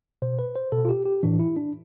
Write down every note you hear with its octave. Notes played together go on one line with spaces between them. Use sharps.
B2 C5
B4
C5
B2 A4
F4
G4
G4
A2 E3 D4
E4
D4